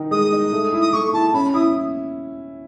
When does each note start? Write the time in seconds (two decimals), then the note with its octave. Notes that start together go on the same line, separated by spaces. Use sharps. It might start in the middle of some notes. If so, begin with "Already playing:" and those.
Already playing: D#3 D#4
0.11 G#3 D#6
0.32 D#4
0.53 A3
0.73 E4
0.81 D#6
0.93 A3 C#6
1.13 E4 A5
1.34 C#4 B5
1.54 E4 D#6